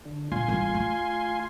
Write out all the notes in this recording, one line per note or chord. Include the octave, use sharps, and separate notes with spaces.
D3
A#2 F4 G#5 C6
A1 G2
A3